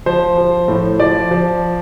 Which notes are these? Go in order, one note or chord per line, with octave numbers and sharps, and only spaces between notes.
F3 C5
F3
A2
F3 D5
F3